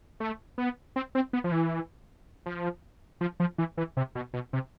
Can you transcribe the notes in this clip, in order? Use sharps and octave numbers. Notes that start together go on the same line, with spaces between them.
A3
B3
C4
C4
B3
F3
E3
F3
F3
F3
E3
E3
C3
B2
B2
C3